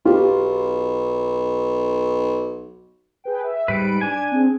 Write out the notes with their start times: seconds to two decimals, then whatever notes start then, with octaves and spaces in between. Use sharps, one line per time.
0.05 B1 F4 G4
3.24 G#4 B4 G5
3.44 E5
3.68 G#2 G3 B4 D7
4.01 D4 G#5 G#6
4.32 C4 G#4